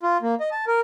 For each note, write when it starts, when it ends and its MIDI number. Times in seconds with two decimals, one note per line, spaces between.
0.03 0.17 65
0.22 0.35 58
0.40 0.49 75
0.52 0.65 81
0.67 0.81 70